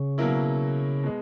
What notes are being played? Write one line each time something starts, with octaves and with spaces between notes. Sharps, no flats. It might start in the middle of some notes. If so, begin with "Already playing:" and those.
Already playing: C#3
B2 F#3 A#3 E4
B2 G#3